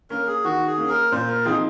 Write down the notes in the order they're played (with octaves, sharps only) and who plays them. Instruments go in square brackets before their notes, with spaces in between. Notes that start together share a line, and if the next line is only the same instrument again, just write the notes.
[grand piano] A#3 C#4 [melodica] A#4
[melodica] G#4
[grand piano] D#3 [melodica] F#4
[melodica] G#4
[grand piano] A#3 C#4
[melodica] A#4
[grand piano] A#2 [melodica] C5
[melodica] A#4
[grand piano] F3 C4 D#4 [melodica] G#4